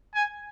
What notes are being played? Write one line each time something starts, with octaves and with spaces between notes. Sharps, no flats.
G#5